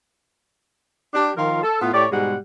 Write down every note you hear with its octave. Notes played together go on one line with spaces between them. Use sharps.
D4 G4
D#3 F3 F4 A#4 F5
A4
A2 B3 F4
A2 G4 C#5 D5
G#2 B2 G3 G#3 F#5